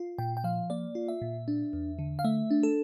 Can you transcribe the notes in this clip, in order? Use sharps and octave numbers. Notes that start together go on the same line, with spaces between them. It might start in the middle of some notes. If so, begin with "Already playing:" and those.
Already playing: F4
A#2 G5
G5
F3 F5
A#3 D5
F4
E5
A#2
D4
E2
D3
F5
A3 E5
D4
A4